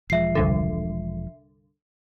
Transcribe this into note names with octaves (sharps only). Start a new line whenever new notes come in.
E1 F3 G#3 E5 C7
C2 G2 D3